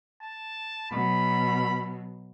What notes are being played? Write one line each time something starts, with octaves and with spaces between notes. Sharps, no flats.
A5
B2 F#3 B5